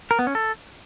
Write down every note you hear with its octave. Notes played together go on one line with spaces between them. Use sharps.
A#4
B3
C#4
A4